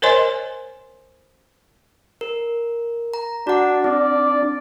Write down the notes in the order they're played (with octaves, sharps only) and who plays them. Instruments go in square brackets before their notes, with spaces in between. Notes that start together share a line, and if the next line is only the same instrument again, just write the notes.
[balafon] A#4 C5 C#5 D#5 G#5 C6
[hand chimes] A#4
A#5
[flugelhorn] D4 [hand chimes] F#4 F#5
[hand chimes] C4 [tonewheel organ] D4 [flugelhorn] D5